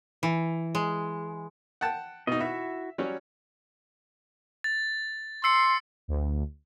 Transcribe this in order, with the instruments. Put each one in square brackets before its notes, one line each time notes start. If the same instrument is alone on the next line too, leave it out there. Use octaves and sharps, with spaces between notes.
[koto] E3
G#3
[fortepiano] F#5 G5 A5
[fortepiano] B2 D#4 [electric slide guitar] D#5
[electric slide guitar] E4 F#4 [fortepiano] E5
[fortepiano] F#3 G3 C#4
[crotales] A6
[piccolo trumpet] C6 [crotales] E6 C7 C#7
[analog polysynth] D2